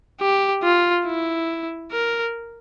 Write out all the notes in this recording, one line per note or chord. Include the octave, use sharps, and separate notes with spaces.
G4
F4
E4
A#4